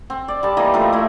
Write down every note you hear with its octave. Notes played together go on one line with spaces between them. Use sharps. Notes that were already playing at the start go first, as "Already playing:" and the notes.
C4
D5
G3 A5
E3 A#3 D#5
F3 A3 C4 A#4
A3 E4